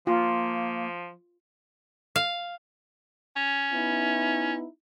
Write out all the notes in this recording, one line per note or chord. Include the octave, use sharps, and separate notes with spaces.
F3 A#3 F4
F5
C#4
B3 D#4 E4